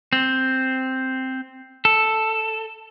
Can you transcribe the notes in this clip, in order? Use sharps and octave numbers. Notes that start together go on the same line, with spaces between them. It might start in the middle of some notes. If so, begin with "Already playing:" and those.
C4
A4